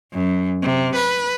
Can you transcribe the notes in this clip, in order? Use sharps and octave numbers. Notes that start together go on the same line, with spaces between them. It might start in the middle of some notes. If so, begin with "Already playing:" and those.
F#2
C3
B4